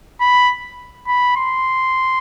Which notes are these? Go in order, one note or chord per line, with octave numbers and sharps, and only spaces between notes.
B5
B5
C6